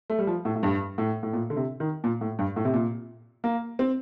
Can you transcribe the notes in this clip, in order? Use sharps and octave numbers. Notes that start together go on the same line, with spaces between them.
A3
G3
F3
A2
A2
G2
A2
A2
A#2
D3
C3
D#3
A#2
A2
G2
A2
C3
A#2
A#3
C4